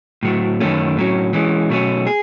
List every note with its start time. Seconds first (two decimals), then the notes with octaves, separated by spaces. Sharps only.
0.23 A2 F#3 A3
0.60 F#2 D#3 A3 C#4
0.97 A2 F#3 C#4
1.33 E3 G#3 C#4
1.70 B2 F#3 A3 C#4
2.07 G#4